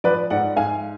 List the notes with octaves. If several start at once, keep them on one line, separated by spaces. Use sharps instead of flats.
F3 B4 D5
G#2 D5 F#5
G#2 F5 G#5